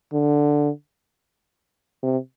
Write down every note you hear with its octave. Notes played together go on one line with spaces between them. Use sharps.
D3
C3